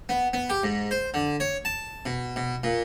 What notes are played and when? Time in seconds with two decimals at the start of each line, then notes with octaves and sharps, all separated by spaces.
0.09 B3
0.33 B3
0.50 G4
0.64 G#2
0.91 C5
1.14 D3
1.40 C#5
1.65 A5
2.06 B2
2.36 B2
2.63 A#2